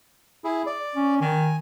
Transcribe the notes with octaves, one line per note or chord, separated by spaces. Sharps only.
E4 G#4
D5
C#4
D#3 G#5